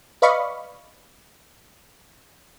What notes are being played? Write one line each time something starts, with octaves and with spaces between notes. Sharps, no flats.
B4 D5 D#5 F5 B5 C#6